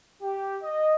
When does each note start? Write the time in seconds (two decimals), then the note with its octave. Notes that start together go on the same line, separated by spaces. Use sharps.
0.22 G4
0.63 D#5